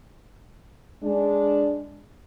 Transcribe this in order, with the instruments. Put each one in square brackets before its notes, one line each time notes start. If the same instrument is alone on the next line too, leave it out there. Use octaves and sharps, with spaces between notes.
[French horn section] G#3 D4